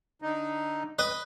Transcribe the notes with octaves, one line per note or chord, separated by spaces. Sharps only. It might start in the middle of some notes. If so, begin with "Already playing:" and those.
D3 D#4
B4 D#5